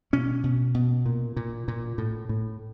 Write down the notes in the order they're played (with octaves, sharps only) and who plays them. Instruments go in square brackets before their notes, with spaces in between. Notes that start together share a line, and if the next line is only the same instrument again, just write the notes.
[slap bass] B2 C#4
B2
B2
A#2
A#2
A#2
A2
A2